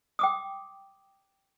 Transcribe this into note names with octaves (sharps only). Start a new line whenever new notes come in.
G5 D6 D#6